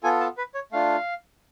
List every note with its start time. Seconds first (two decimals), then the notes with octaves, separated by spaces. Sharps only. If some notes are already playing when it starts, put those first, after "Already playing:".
0.03 B3 F4 A4 G#5
0.20 A5
0.38 B4
0.54 C#5
0.72 A3 D4 F4 F5